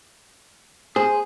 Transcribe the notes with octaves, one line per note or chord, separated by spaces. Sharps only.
G#4 C5